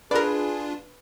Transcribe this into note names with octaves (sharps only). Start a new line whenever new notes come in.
D4 F4 G#4 A#4 B4 D5